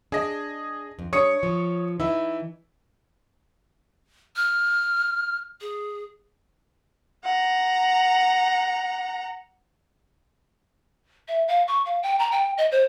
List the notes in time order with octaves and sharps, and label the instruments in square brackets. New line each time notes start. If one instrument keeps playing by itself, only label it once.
[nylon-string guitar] D4 [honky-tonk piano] G#4 D#5
[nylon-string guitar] F2
[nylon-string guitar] G3 D4 [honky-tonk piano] C#5 D#6 C#7
[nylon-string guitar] F3
[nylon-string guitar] E3 D#4 [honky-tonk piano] E4
[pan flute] F6
G#4
[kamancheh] F#5 A#5
[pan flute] E5
F5
C#6
F5
G5
A#5
G5
D#5
C5